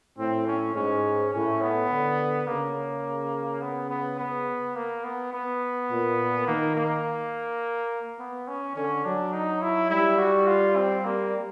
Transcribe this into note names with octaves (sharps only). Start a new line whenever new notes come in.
A2 C4
C#4
G#2 C#4
A2 C#4
B3
D3
C#3 A#3
B3
B3
B3
A#3
B3
B3
A#2
D#3 A#3
A#3
B3
C#4
D3 C#4
F#3 D4
D#4
E4
G3 E4
F#4
F4
C4
A#3